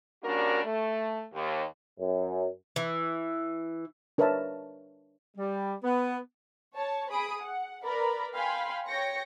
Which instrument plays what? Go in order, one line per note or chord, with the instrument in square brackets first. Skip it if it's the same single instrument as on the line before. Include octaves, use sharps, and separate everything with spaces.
[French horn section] G3 A#3 C#4 D4 F#4 A#4
A3
D#2
[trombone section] F#2
[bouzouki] E3
[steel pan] D4 A#4 B4 C#5 E5 A5
[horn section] G3
B3
[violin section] C#5 A5
G#4 B5 D#6 D7
F#5
A#4 B4 D5 A#5 B5
F5 G5 G#5 B5 C6
C#5 G5 A#6 C#7